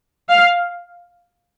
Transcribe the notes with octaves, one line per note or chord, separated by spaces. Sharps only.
F5